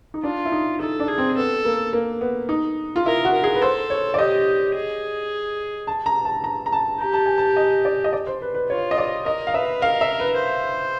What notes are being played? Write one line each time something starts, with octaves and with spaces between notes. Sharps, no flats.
D#4
D4 F4
E4
D#4
D#4 A4
D4
G#4
C4
B3 A4
A#3
A#3
B3
D#4
F4
E4 A#4
F#4
A#4
G#4
B4
A4 C5
C#5
D5
G4 D#5
G#4
A5
A#5
A5
A#5
A#5
A5
G4 A#5
A5
G#5
A5
D#5
D5
D#5
D5
C5
B4
B4
F4 C#5
D#5
D5
A#4 D#5
F5
B4 E5
A#4 F5
E5
B4
C5